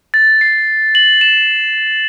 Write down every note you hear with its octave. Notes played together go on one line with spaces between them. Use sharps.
A6
C7
F#7
E7